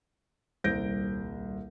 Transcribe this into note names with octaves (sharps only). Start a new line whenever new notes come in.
D#1 C2 C5 G6 A#6 D7